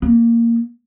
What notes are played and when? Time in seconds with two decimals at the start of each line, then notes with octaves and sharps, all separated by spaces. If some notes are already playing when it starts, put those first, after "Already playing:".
0.02 A#3